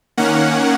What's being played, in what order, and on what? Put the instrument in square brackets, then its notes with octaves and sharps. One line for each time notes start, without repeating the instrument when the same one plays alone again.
[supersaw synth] D#3 A#3 C#4 F#5